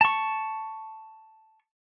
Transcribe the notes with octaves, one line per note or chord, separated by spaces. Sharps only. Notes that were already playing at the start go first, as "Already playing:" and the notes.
A5 C#6